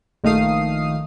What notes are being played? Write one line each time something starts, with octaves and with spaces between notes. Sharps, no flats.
A#1 D#3 A3 F5 D#6 C7